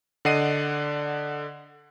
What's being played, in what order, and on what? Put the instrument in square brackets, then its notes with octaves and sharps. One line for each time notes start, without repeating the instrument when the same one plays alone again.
[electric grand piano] D3 D5 D#5 F#5 C7 D#7